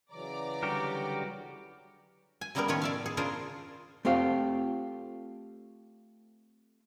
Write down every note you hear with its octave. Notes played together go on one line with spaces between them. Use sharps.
C#3 E3 F#3 D5 A#5 D6
D3 G3 F#4 G4 A#4
G#5
C#3 F#3 G3 A#3 B3 A#4
A2 D#3 F3 C#4 F4 C#5
D5 E5 F5
G#4
C#3 D4 F4 G#4 A#4 C5
A3 C4 F4 G4 F5